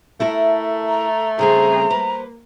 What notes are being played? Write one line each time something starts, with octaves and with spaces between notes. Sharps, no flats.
A3 E4 A4 A#4
A#5
C#3 G3 C4 G#4 C5 A#5
A#3 B4 C5